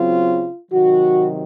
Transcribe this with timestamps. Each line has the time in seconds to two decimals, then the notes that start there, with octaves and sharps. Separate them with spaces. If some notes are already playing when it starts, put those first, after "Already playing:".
Already playing: C#3 F#3 C4 F4
0.72 C3 D#3 F#3 F#4